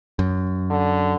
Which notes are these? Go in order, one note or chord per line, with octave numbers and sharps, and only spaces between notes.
F#2
D3